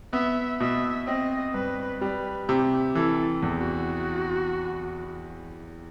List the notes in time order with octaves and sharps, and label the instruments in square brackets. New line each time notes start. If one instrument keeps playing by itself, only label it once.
[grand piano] B3 [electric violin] E5
[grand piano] B2 [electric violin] E5
[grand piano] C4 [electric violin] D#5
[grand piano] G2 [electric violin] B4
[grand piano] G3 [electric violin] B4
[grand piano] C3 [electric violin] G4
[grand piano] E3 [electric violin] A4
[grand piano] E2
[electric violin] F#4